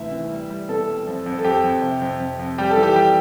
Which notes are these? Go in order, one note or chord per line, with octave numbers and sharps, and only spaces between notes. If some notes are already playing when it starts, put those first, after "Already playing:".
Already playing: D2 C3 E3 E5
E3
G3
G3
B2 A4
G3
F2
F2
A4
F2 G4
F2
C3
F2
F2
F2
G3 G4
A4
E3
G4
G3 G4